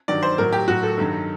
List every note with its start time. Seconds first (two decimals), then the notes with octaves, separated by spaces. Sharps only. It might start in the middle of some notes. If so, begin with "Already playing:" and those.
0.08 G2 D#3 F#3 D5
0.23 C5
0.38 A2 F#3 A#4
0.53 G4
0.68 A2 F#3 F#4
0.83 A4
0.98 G2 D#3 F#3